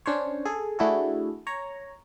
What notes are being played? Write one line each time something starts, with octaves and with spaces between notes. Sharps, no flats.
C#4 D4 C5 C#5
G#4 A4
A3 D4 E4 F#4 G#4 A4
C#5 A#5